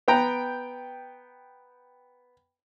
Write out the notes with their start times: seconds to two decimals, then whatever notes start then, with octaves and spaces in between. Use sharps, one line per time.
0.08 B3 G5 A#5